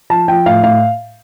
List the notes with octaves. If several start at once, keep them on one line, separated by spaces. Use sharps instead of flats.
F3 A5
F3 G5
A2 F5
A2 F5